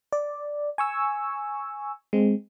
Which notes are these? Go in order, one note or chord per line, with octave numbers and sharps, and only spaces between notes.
D5
G#5 C#6 E6
G#3 C4